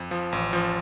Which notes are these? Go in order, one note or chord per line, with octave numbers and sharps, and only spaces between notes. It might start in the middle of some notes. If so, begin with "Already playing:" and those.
Already playing: F2
F3
A1
F3